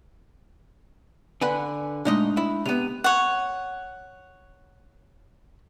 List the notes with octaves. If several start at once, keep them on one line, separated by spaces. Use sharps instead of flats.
D3 B4 F#5 G#5
A#2 G#3 A3 D4 D#4 D#5
E4
C3 B3 D#7 F7
C#5 F#5